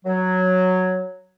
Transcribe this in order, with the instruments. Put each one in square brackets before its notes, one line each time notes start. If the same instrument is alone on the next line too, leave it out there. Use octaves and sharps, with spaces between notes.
[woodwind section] F#3